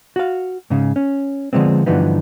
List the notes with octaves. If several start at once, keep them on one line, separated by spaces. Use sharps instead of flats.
F#4 F5
G#2 C#3
C#4
D3 F3 G#3 B3 C4
G2 D3 E3 F3 B3 D#4